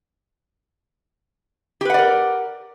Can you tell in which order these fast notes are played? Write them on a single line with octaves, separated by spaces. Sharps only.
G4 B4 F#5 D5 A#4